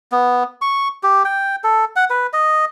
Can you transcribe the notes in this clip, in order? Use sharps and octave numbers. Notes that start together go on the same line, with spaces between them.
B3
C#6
G4
G5
A4
F#5
B4
D#5